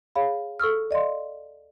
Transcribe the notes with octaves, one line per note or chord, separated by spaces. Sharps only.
G#4 C#5 F5 B5
A4 C#6 E6 F6
D5 D#5 F5 C6